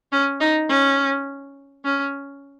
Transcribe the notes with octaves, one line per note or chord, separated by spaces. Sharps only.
C#4
D#4
C#4
C#4